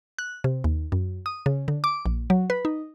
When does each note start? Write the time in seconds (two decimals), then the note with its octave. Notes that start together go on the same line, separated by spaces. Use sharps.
0.19 F#6
0.44 C3
0.64 D#2
0.92 F#2
1.26 D#6
1.46 C#3
1.68 D3
1.84 D6
2.06 A#1
2.30 F#3
2.50 B4
2.65 D#4